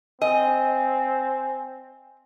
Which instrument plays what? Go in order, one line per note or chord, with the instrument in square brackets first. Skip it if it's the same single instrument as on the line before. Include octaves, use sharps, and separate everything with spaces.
[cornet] C4 [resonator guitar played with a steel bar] D#5 [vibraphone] G#5